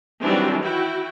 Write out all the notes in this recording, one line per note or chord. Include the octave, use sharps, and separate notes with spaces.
D#3 E3 F#3 G3 C4 D4
E4 F#4 G5